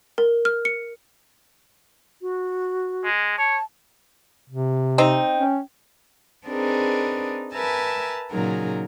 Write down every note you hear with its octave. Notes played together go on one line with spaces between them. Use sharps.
A#4
F6
C#7
F#4
G#3
C#5 A5
C3
C4 D#4 G5
C#4
C4 D4 D#4 G#4 A#4 B4
A#4 B4 E5 G#5 A5
A#2 C#3 F#3 D#4 G#4 A#4